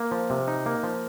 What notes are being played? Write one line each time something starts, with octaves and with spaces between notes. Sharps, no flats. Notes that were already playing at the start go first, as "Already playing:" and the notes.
Already playing: A#3
F3
C3
D#4
A#3
F3